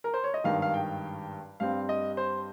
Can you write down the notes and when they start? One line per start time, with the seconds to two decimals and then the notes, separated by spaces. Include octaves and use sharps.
0.04 A#4
0.14 C5
0.24 C#5
0.34 D#5
0.44 G#1 G2 D#3 F5
0.62 F5
0.74 G5
1.60 G2 G3 C4 F5
1.89 D#5
2.17 C5